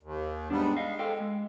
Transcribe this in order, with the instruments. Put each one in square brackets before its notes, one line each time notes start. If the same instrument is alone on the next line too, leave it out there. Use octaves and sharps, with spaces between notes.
[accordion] D#2
[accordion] G#2 G3 B3 [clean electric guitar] D4
[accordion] G#3 [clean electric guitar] D#5 F5
[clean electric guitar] A4 F5 G5
G#3